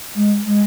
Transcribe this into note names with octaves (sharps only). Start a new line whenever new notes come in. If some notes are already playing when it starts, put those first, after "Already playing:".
G#3
G#3